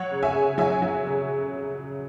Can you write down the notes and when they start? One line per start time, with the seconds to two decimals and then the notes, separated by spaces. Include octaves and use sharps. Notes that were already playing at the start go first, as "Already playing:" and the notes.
Already playing: F#3 C#5 F#5
0.11 C#3
0.23 E5 G#5
0.34 C#3
0.58 F#3 E5 G#5
0.82 F#3
1.06 C#3